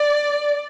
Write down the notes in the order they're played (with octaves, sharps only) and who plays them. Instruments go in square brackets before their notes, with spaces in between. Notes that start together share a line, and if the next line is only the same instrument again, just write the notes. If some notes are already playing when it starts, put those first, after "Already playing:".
Already playing: [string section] D5